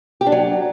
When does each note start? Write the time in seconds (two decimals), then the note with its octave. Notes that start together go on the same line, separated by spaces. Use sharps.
0.21 G4
0.26 D4
0.32 F#3